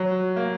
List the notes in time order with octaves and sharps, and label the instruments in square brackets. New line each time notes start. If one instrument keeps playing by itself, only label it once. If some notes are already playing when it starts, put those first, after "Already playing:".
Already playing: [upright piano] F#3
A#3